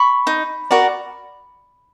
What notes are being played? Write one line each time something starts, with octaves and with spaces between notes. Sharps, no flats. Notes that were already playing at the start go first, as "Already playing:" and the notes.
Already playing: B5 C#6
D#4
F#4 A#4 D5